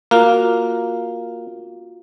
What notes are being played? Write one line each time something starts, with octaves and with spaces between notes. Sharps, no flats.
A#3 F4 F#4 F5